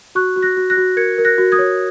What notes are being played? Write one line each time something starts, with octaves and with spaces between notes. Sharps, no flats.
F#4 C#6 F#6
F#4
F#6 A#6
F#4
F#6 A#6
F#4
A#4 G#6 C#7
A#4
F#6 A#6
F#4
D#6 G#6
C#5